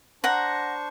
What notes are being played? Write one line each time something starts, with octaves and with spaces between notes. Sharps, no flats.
D4 C5 F#5 A#5 C#6